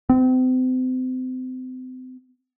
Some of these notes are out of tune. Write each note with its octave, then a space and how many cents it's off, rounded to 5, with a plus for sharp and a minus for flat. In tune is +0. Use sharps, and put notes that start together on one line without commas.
C4 -35